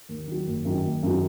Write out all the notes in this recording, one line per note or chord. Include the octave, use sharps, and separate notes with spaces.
D#2
D#3 F#3
F#1
F#2 D#3 F#3
F#1
F#2 D#3 F#3